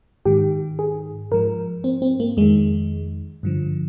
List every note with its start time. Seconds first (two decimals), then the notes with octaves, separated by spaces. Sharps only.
0.25 G#2 D#3 G4
0.79 G#4
1.32 G#2 F3 A#4
1.84 C4
2.02 C4
2.20 A#3
2.37 F2 D#3 G#3
3.43 G2 D3 F3